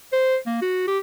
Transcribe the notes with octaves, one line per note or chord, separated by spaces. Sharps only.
C5
A#3
F#4
G4